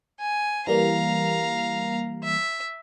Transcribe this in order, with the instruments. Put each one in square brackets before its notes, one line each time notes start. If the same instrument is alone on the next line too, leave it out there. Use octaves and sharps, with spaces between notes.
[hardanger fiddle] G#5
[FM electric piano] E3 G3 A#3 [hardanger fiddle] F5 A#5
[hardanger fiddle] E5